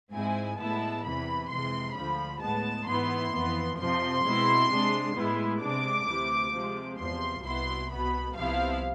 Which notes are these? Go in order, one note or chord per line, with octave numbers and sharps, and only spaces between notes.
G#2 G#3 C4 E4 G#5
A2 G#3 B3 E4 A5
E2 C3 E3 B5
F2 C3 E3 G#3 C6
D2 D3 F3 B5
A2 G#3 B3 A5
G#2 E3 B3 E4 C6
F2 E3 B3
F2 C3 F3 C6
B2 G#3 C4 E4
C3 G#3 D4
A2 G#3 B3 E4
C3 G#3 D4 D6
D2 C3 E3
C3 F3 G#3
E2 C3 F3 C6
C2 B2 B3 E4 C6
C2 B2 B3 B5
C2 C3 F3 B3 E4 F5